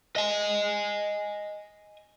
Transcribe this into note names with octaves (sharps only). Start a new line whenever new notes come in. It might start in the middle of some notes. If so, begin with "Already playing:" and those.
D#5 G#5